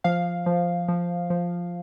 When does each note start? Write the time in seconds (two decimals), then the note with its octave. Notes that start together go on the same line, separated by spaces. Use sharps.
0.04 F3 F5
0.46 F3
0.88 F3
1.30 F3